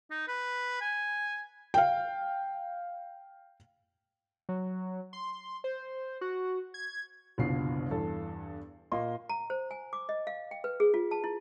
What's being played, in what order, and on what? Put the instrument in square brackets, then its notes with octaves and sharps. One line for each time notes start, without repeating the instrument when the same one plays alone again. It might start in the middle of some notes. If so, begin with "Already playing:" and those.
[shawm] D#4
B4
G#5
[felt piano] F5 G5
[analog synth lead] F#3
C6
C5
F#4
G#6
[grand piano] F#1 C2 B2 D3 F4 C7
E2 G2 A4
A#2 A#3 D#5 C6
[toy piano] A#5
C5
G#5
D6
D#5
F5
G5
B4
G#4
F4
A5
E4